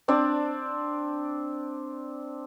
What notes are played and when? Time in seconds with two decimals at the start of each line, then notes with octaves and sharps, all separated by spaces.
0.08 C4 D4 D5